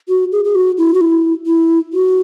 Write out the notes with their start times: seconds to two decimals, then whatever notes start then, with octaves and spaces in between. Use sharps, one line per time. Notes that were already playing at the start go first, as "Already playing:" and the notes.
0.08 F#4
0.32 G#4
0.44 G#4
0.55 F#4
0.78 E4
0.94 F#4
1.01 E4
1.47 E4
1.93 F#4